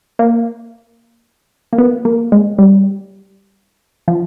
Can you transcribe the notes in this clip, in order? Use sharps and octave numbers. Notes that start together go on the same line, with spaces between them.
A#3
A#3
B3
A#3
G#3
G3
F3